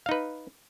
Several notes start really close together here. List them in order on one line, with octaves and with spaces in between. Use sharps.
F5 D#4 B4